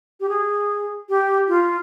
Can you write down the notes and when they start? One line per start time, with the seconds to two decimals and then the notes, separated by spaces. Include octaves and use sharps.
0.20 G4
0.29 G#4
1.09 G4
1.48 F4